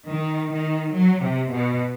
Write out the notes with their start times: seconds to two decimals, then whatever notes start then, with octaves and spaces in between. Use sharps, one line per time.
0.09 D#3
0.52 D#3
0.94 F#3
1.22 C3
1.51 B2